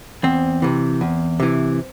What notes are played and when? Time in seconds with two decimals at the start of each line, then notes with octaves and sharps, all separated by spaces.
0.23 E2 C4
0.62 C3 E3
1.01 E2
1.40 C3 E3